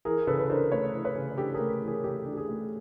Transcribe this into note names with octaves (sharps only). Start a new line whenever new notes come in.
E3 G#4 A#4
C#3 A4 B4
B4
D4 A#4 C5
A3 B4 C#5
E3
B4 C#5
C#3
D4 G4 A4
G#4 A#4
A3
E3
G#4 A#4
C#3 G4 A4
D4
G4
G#4
A3